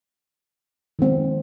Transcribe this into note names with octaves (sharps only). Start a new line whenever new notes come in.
D#3 G#3 C4